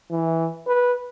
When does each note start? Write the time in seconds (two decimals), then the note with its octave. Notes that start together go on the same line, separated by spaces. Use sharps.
0.11 E3
0.67 B4